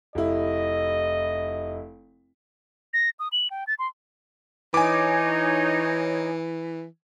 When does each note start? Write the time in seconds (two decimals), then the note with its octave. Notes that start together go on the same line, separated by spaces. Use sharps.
0.15 F1 E4 D#5
2.93 A#6
3.19 D#6
3.32 F#7
3.50 G5
3.67 A6
3.79 C6
4.74 E3 D#4 C#5 G#5 D6